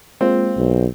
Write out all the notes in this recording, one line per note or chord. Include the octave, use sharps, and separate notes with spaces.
G#3 A#3 C4 F4
B1